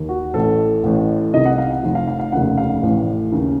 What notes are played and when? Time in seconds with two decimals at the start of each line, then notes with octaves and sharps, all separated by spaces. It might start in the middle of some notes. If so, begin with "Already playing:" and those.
Already playing: D#2 D#3
0.09 F#4
0.34 A1 A2 A4
0.84 A1 A2
1.34 C2 C3 D#3 D#5
1.45 F#5
1.58 F5
1.71 F#5
1.83 F1 F2 D#3
1.95 F5
2.08 F5
2.20 F5
2.32 F1 D#2 C#3 F#5
2.58 F5
2.82 A1 A2
3.32 D#2 C#3